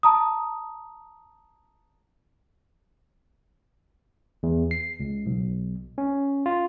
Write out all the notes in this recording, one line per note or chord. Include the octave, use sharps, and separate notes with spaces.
A5 A#5 D#6
E2
C7
C#2
B1
C#4
F4